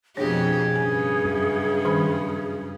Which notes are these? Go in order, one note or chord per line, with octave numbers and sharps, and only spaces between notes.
F2 B2 D4 G4 G#4 C#5
G2 C#3 G#5
F#2
D#3 G3 B5